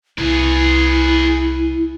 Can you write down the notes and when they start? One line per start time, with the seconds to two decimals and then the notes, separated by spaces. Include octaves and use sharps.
0.18 C2 E4 G#4 B4